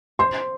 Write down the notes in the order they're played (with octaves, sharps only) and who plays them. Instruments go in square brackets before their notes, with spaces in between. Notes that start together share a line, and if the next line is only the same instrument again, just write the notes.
[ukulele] C5 [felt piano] C6